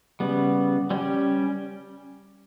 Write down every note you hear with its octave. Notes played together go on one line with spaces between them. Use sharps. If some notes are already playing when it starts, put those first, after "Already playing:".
C#3 G3 B3
G3 C#4 G4